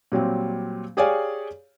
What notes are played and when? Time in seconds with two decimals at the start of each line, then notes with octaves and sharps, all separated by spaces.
0.12 A#2 F#3 G3 C4
0.97 G4 G#4 C#5 D5 F5 G#5